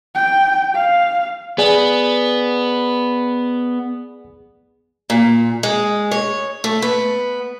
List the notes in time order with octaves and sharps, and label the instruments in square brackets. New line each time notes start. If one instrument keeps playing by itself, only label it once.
[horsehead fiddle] G5
F5
[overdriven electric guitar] B3 [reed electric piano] G#4 D5 G#5
[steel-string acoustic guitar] A#2
G#3
C#5
A3
B3